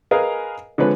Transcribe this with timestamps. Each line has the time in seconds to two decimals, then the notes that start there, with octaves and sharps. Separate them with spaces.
0.11 G#4 A#4 B4 D#5 F5 G#5
0.78 D3 F3 G#3 B4 C#5